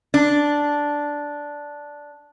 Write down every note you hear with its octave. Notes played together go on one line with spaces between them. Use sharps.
D4